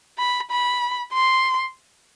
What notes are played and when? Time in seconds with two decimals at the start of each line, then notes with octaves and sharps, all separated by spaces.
0.18 B5
0.51 B5
1.13 C6